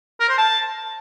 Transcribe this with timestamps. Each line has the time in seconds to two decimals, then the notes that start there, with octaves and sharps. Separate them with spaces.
0.20 A#4
0.29 C5
0.38 A5